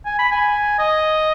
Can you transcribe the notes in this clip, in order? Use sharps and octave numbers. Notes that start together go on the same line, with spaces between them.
G#5
B5
G#5
D#5